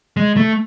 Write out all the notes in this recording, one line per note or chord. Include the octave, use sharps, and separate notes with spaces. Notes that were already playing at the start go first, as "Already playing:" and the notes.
G#3
A3